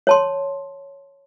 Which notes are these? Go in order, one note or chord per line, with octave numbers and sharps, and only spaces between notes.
C#5 A5 C6